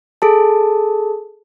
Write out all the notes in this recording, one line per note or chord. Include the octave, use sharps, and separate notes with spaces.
G#4 A4 A5